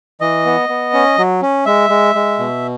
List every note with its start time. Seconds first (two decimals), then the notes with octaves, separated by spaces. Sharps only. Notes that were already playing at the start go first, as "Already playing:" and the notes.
0.21 E3 D#5
0.46 B3
0.69 B3
0.94 C#4
1.18 F#3
1.42 C#4
1.66 G#3 E5
1.90 G#3
2.15 G#3
2.39 B2